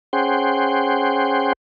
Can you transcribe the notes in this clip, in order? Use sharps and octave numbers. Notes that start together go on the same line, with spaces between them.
C#4 G#4 C5 F#5 G5 C6